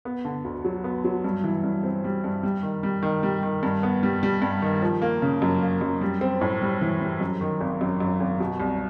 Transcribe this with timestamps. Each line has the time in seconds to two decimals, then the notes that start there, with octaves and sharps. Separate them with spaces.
0.05 B3
0.25 D3
0.45 D2
0.65 F#3
0.84 B3
1.04 F#3
1.24 G2
1.44 E3
1.64 G2
1.84 C4
2.04 G3
2.24 G2
2.43 G3
2.63 D#3
2.83 G3
3.03 D#3
3.23 G3
3.43 D#3
3.63 G2
3.83 B3
4.03 G3
4.23 G3
4.42 G2
4.62 D#3
4.82 F3
5.02 A#3
5.22 C#3
5.42 F#2
5.62 A#3
5.81 F#2
6.01 G3
6.21 C4
6.41 A2
6.62 G3
6.81 E3
7.01 G3
7.20 F#2
7.41 D#3
7.61 G#1
7.81 F#2
8.00 F#2
8.20 G#1
8.40 B2
8.60 C2